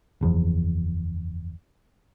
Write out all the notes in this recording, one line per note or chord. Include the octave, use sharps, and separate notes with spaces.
F#1 E2 F3